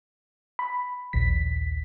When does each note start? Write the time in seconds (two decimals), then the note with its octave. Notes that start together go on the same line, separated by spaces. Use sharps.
0.59 B5
1.13 A#1 D#2 B6